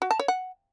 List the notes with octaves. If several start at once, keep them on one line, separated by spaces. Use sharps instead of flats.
F#4
A5
C#5
F#5